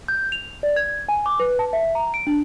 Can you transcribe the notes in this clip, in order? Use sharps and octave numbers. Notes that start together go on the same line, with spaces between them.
G6
F7
D5
G#6
G#5
D6
B4
A5
E5
A#5
D7
D4